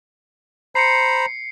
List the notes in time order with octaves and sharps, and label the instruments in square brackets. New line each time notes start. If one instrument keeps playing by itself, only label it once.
[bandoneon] C5 A#5 B5 [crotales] C7 C#7